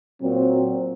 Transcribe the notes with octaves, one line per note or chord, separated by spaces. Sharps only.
A#2 F#3 C4